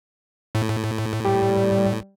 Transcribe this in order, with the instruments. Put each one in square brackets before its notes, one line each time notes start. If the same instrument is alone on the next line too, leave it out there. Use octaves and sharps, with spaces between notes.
[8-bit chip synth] A2
[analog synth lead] G3